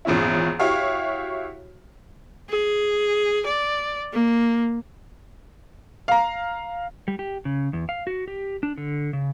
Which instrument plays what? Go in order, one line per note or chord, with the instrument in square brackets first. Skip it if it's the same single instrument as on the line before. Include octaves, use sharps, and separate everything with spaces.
[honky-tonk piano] G#1 E2 A#2 C#4 E4
E4 F#4 G4 C#5 F5
[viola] G#4
D5
A#3
[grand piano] F5 A#5
[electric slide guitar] G3
G4
C#3
E2
F5
F#4
G4
D4
D3
C#3